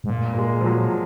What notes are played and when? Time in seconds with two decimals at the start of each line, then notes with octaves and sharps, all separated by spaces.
0.04 G#2
0.10 A#2
0.33 A#3
0.38 G#3
0.61 F3
0.66 F#3